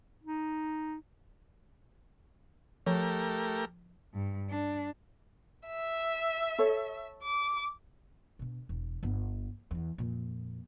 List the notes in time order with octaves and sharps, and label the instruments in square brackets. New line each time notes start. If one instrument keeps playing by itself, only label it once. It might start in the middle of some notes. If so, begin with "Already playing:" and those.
[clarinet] D#4
[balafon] F3 [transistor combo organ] A3 G4 A#4
[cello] G2
D4
[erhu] E5
[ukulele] A4 C#5
[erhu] D6
[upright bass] B2 D3
E1
G1 B3
E2 E3
F2 A#2